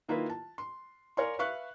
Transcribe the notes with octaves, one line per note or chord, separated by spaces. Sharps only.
D#3 A#3 E4 F4 B4
A5
C6
A#4 C#5 D5 F5 G#5 C6
B4 E5 F5 C#6 F#6